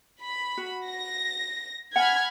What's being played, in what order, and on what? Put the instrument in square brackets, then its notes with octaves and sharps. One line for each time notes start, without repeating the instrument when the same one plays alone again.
[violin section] B5
[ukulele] F#4
[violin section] A#6
[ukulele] F#5 G#5 [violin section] B5 F6 G#6